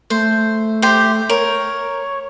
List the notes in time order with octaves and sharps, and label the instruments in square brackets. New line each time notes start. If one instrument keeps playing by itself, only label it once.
[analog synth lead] A3 [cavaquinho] C5
[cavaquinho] G4 C5
[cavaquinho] A#4 [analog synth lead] C#5